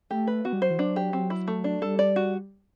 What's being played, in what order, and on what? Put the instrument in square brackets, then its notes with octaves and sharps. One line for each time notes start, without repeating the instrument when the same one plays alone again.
[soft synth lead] A3 [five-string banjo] G4
[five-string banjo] B4
[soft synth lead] B3 [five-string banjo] F#4
[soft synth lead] G3
[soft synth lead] F#3 [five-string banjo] C5
[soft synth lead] E3
[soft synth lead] F#3 [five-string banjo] D4
[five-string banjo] G4
[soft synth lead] F#3 [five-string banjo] C4
[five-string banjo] E4
A3
D4
[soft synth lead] G3 [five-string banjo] A4
[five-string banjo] D5
F#4